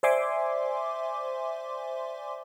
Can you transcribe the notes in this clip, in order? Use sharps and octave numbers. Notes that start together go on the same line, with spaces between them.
C5 D5 E5 G#5 C6 D6